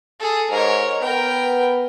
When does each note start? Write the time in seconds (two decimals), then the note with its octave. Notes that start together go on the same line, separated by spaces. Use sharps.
0.20 G#4 A4
0.51 G#2 A#4 C#5
1.02 B3 A#4 G5